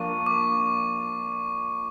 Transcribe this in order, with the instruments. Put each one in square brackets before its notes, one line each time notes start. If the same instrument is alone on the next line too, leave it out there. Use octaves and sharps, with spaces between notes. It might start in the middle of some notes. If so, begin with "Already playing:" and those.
Already playing: [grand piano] F3 A#3 D4 F4 [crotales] C#6
[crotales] D6